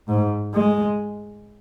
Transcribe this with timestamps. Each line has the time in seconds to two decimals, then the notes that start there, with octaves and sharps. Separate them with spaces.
0.08 G#2
0.54 G#3